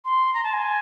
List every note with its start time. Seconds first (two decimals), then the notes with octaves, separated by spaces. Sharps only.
0.05 C6
0.34 A#5
0.44 A5
0.53 G#5